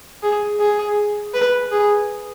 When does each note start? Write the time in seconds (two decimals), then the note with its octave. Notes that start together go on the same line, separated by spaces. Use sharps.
0.23 G#4
0.60 G#4
1.34 B4
1.72 G#4